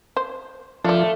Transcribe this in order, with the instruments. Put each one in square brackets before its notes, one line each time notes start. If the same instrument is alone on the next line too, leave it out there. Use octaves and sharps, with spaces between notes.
[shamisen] C5
[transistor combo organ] F3 F4 [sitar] A3 [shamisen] D4 D5